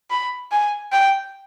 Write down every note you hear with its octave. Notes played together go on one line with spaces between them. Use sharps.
B5
G#5
G5